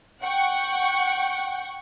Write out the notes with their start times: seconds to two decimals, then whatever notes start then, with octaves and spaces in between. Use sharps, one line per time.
0.23 F#5 G5 C#6